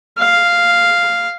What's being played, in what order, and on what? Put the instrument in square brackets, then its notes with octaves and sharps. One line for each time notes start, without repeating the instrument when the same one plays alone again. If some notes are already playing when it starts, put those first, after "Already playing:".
[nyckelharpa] F5